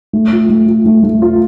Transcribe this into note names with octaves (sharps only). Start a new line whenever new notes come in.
A3
F4
A3
F4
A3
A3
F4